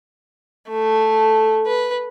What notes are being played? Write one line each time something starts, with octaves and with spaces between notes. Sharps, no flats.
A3
B4